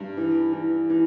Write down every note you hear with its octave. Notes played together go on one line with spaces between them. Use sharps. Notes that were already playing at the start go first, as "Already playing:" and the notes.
Already playing: G2
E3
E3
E3